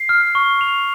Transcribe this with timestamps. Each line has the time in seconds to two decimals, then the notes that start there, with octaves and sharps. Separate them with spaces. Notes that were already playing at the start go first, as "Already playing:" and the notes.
Already playing: C7
0.09 F6
0.35 C#6
0.61 F7